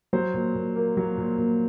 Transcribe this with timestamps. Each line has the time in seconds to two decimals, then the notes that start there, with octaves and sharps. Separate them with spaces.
0.13 F#3 C5
0.34 A#2
0.55 A#2
0.75 A#3
0.97 F#3
1.18 A#2
1.38 A#2